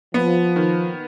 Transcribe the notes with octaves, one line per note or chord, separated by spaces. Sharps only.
F3 B3
D#3